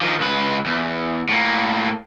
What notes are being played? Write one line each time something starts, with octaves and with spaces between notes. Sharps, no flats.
D#3 F3
C#2 B4
E2
A2 A#3